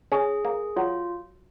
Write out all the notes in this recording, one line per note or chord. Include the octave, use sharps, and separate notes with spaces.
C#4 G#4
A#3
F#3 F4